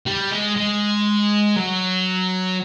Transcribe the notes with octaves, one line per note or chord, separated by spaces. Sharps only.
G3
G#3
G#3
F#3